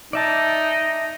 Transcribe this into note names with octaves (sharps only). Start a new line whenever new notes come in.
D#4 D5 E5 A5